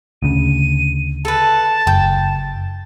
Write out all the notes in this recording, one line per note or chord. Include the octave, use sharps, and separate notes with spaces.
D2 C#3 D#7
A4 B4 A5
F#1 G5